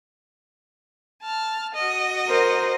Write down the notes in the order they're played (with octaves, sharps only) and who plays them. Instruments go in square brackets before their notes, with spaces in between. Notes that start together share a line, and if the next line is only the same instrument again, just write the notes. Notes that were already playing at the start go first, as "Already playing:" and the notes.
[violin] A5 F6
F#4 D#5
[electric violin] A#4 C5